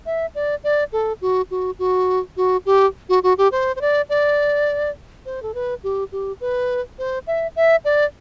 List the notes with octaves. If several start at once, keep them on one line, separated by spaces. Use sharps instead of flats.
E5
D5
D5
A4
F#4
F#4
F#4
F#4
G4
F#4
F#4
G4
C5
C5
D5
D5
C5
A4
B4
G4
G4
B4
C5
E5
E5
D5